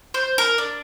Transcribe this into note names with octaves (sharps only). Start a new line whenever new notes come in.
C5
A#4
D4